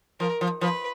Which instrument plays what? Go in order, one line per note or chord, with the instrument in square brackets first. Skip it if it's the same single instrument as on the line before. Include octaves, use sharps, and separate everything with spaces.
[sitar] F3 [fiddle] A#4
[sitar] F3
[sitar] F3 [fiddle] B4